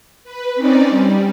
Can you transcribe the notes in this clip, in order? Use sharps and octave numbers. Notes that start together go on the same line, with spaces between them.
B4
C4 C#4 D#4 D5
G3